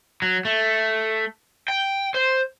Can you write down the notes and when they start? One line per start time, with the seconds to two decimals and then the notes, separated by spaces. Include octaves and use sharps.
0.22 F#3
0.45 A3
1.68 G5
2.14 C5